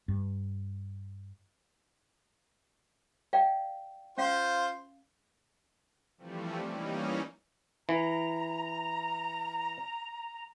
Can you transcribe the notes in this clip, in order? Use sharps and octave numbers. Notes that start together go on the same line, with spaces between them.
G2
D5 F5 G5
C#4 F4 C5 F5
C3 E3 F3 G3 A3
E3 G3 A#3 C#4 D#4
E3 A#5